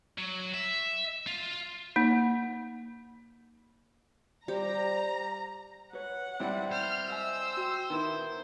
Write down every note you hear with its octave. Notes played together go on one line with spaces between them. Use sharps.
F#3
E5
F4
A#3 D#4
G3 G4 C5 A#5
B4 C#5 F#5
G3 C4 E4
C5 F6
D#5 E5 G#5 E6
F#4 G5
D#3 B3 E4